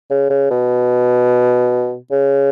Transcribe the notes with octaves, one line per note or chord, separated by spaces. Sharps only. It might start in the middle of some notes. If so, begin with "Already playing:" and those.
C#3
C#3
B2
C#3